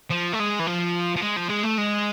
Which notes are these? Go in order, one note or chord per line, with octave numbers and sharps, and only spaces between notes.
F3
A3
G#3
E3
F3
F3
G#3
F3
G#3
A3
G#3